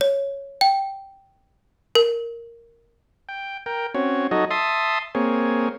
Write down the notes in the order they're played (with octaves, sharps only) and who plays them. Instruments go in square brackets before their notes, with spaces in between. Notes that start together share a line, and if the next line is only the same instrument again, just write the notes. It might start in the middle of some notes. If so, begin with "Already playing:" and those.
[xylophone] C#5
G5
A#4
[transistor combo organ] G5
A#4 G5
C4 C#4 F#4 C#5
F#3 D#4 F#4 A4 C#5 D#5
E5 A5 C6 D#6
A#3 C4 G#4 C#5